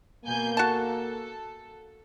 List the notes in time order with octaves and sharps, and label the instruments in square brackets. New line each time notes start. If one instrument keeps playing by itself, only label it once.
[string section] B2 G#5 G6 [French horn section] A#3
[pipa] F#4 A5 [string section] A4